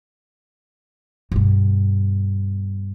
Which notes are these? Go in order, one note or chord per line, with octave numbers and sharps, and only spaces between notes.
G2 B2